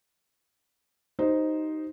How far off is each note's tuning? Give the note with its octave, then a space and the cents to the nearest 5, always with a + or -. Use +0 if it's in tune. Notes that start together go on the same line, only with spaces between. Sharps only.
D#4 +0 G4 -35 C5 +0